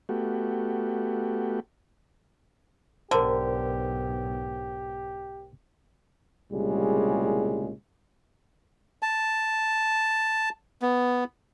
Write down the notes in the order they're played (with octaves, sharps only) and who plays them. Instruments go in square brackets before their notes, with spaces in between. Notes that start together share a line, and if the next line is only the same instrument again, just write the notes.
[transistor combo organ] A3 B3 F#4 G4
[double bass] B1 G#2 [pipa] D3 [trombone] G4 [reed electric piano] A#4 C5
[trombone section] C2 A#2 C#3 G3 G#3
[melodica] A5
B3